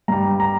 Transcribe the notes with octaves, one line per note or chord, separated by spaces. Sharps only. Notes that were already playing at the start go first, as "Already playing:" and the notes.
G2 G3 A#5
A#5